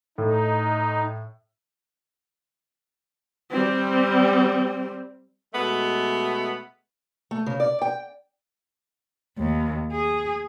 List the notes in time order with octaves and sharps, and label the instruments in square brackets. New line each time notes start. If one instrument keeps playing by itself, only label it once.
[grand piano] A2 [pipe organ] D#4
[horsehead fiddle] G3 C4
[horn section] B2 G#3 A3 B3
[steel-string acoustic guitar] A3
C#3
D5
G5
[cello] D#2
G#4